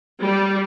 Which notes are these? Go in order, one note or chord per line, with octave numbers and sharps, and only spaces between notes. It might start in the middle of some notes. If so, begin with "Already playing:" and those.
G3